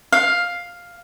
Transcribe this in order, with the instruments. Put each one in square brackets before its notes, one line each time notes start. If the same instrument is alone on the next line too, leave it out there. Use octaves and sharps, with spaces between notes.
[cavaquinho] F5